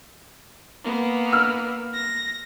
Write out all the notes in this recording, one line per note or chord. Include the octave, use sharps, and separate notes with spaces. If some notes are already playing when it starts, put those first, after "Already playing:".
A#3 B3
E6 F6
A#6